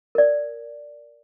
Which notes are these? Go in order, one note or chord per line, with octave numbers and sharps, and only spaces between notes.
A#4 D5